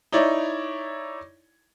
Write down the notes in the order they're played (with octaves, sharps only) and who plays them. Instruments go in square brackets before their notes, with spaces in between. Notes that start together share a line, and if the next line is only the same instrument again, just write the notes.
[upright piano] D#4 E4 C#5 D5